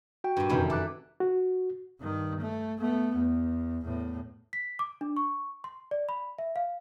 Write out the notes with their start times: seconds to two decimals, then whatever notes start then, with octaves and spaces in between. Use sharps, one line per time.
0.24 F#4 G5
0.37 G2 A#2
0.49 F1 F#2 D#3 E3 G3 B5
0.70 A4 E5 D6 F#6
1.20 F#4
2.00 G2 D#3
2.40 A3
2.80 A3 B3
3.17 E2
3.84 E2 A2
4.53 B6
4.79 D6
5.01 D4
5.17 C#6
5.64 C6
5.91 D5
6.09 B5
6.38 E5
6.56 F5